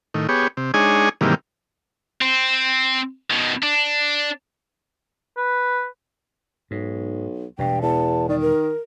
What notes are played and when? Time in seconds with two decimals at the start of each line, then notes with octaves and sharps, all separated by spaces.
0.14 A2 D#3
0.29 B3 G4 G#4 C#5
0.57 C3
0.74 G#3 D4 D#4 G#4 C#5 G#5
1.21 G#2 C3 D#3 E3 G3 A#3
2.22 C4
3.31 B2 D#3
3.63 D4
5.37 B4
6.71 B1 G#2
7.59 E1 G2 B2 G5
7.82 E2 A5
8.29 D#3 D5
8.41 A#4